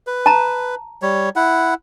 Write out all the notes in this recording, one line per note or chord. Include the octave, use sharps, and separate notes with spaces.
B4
A5 A#5
G3 C#5
E4 F#5